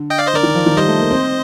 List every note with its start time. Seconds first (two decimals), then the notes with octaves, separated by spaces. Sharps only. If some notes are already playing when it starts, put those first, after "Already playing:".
Already playing: D3
0.10 D#5 G5
0.18 D5 F5
0.27 C5 D#5
0.33 D3 A#4 D5
0.43 D#3
0.55 F3
0.66 D#3
0.77 G3 C5 D#5
0.88 A3
0.99 A#3
1.11 C4